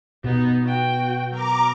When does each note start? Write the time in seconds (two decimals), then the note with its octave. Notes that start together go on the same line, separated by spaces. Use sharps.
0.24 B2 B3 D#4
0.64 F#4 G5
1.31 F#3 A#4 A#5 D6